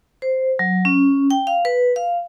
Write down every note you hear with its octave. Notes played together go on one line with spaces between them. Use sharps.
C5
F#3
C#4
G5
F5
B4
F5